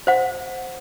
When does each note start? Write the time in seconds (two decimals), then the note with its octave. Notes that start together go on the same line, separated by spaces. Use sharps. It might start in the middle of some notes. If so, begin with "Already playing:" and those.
0.07 C5 F#5